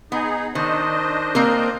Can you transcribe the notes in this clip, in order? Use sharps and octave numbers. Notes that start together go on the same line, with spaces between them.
B3 D#4 G#4
D#3 D4 C5 D#5
A#3 C4 A#4